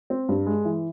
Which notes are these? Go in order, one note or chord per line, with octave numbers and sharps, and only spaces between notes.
C4
G2
G#3
E3